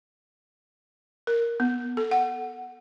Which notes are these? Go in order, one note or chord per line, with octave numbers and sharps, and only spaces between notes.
A#4
B3
A4
F#5